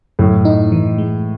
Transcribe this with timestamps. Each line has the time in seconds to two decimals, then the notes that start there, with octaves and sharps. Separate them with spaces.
0.19 F#2 A2
0.45 D#4
0.72 E3
0.98 G#3